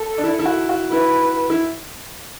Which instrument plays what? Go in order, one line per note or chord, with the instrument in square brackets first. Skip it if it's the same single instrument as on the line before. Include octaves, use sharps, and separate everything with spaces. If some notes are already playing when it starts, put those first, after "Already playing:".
Already playing: [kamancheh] A4
[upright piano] D4
E4
E4
F#4
F#4
[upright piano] E4 [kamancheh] B4
[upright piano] E4